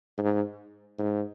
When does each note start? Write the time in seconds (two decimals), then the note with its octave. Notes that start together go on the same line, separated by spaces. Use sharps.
0.18 G#2
0.98 G#2